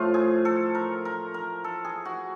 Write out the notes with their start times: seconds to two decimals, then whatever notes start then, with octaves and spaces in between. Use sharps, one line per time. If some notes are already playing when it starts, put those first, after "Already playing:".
Already playing: A2 F3 A3 F4
0.14 G#4
0.45 A4
0.75 A#4
1.05 A#4
1.34 A#4
1.64 A4
1.84 G#4
2.05 F#4